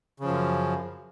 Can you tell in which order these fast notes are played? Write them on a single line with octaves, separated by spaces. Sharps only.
C#3 F3 F#2